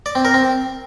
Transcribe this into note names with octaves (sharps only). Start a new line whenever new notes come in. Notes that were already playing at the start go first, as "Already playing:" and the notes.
D5
C4
A#4
C4